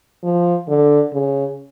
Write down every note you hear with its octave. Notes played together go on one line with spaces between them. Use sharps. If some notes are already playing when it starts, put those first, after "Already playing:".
F3
D3
C#3